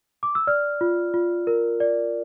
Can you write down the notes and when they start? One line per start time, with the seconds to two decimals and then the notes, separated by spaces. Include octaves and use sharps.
0.23 D6
0.35 E6
0.47 D5 F6
0.81 F4
1.14 F4
1.47 A#4
1.80 D5